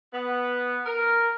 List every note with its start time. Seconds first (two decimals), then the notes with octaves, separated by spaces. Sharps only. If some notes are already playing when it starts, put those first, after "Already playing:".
0.13 B3
0.85 A#4